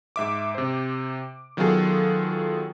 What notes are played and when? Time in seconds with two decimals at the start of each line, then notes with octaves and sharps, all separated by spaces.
0.16 G#2 E5 D6
0.55 C3 C5
1.57 D#3 F#3 B3 F4 G#4 A4